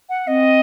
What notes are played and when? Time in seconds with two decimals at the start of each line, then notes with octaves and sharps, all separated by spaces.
0.09 F#5
0.27 C4 D#5